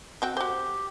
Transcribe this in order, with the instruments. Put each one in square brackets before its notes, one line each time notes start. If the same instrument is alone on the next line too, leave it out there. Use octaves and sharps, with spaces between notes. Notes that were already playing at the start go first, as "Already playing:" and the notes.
[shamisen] C4 F#4 G5
[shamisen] F#4 C5 [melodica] G4